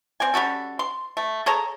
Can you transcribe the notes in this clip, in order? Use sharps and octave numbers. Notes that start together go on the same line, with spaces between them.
C4 D5 G#5
G3 C#4 F#4 A4
C6
A3
G#4 A4 C#5 A#5